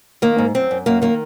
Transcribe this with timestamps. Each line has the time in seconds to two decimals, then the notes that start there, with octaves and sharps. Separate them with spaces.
0.22 D#3 A#3
0.38 G#2
0.55 F#2 C4
0.71 F#2
0.86 F#2 A#3
1.02 D#3 A#3